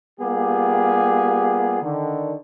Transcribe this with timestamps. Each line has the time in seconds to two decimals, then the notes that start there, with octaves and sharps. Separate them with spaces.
0.20 G3 A#3 B3 F4 G4 G#4
1.82 D3 D#3